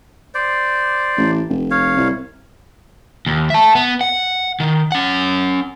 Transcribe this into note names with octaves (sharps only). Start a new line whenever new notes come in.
C5 D5
A1
F1
C#5 F5
C2
D#2
E5 A5
B3
F#5
D#3
C#4 F#5